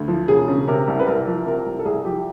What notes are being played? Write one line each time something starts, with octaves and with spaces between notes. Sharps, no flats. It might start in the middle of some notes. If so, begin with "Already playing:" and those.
Already playing: D2
F3
E1 G#4
C#3
C3 A#4
C2
B4
C2 A#4
F3
C3 A#4
C2
A4
C2 G#4
F3 G4